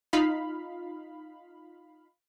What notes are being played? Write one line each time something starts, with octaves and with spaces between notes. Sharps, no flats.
D#4 F4 F5 B5